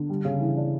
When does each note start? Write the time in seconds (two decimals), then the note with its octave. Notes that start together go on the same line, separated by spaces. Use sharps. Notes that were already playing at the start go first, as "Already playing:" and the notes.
Already playing: D3
0.09 G3
0.25 C#3
0.40 E3
0.57 D4